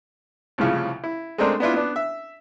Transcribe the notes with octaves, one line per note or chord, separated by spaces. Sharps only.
C2 A2 C#3 F3
E4
G#3 A3 C4 D4 A#4
B3 D4 E4 F4
B3 D4
E5